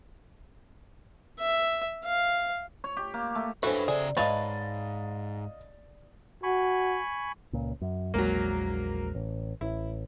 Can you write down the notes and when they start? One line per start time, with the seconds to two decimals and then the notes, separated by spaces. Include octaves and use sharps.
1.40 E5
2.05 F5
2.84 C#5
2.97 G4
3.14 A#3
3.35 A3
3.63 E3 C#4 D4 F#4 A4 B4 C5
3.88 C#3 G#4 D5 E5
4.17 D#2 G#2 B4 C#5 D#5 F5 A5 A6
6.43 F#4 G#5 B5 C#6
7.53 C#2 A#2
7.82 F#2
8.14 A#1 E2 F#3 G#3 A#3
9.15 A1
9.61 A1 E4